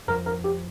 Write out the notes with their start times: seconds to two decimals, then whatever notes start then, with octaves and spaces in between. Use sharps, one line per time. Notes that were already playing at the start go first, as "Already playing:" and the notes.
0.08 F2 F3 A#4
0.26 A#4
0.44 G4